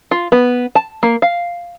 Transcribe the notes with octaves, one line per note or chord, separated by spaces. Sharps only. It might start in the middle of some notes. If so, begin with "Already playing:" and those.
F4
B3
A5
A#3
F5